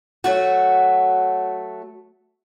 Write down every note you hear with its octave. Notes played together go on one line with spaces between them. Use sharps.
F#3 A3 F#4